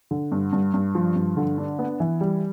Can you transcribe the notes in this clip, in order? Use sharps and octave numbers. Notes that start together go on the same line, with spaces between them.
D3
G2
G2
G2
F3
G2
D3
D4
B3
E3
G3